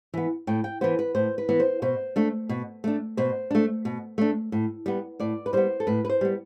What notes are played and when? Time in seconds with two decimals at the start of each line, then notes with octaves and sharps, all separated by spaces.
0.14 E3 B3
0.47 A2 G5
0.64 G5
0.81 E3 B3 C5
0.99 B4
1.15 A2 C5
1.38 B4
1.49 E3 B3
1.60 C5
1.82 B2 C5
2.16 A3 D4
2.49 B2
2.84 A3 D4
3.17 B2 C5
3.51 A3 D4
3.85 B2
4.18 A3 D4
4.52 A2
4.86 G3 B3
5.20 A2 D5
5.46 B4
5.53 G3 B3 C5
5.80 A4
5.87 A2 B4
6.05 B4
6.10 C5
6.21 G3 B3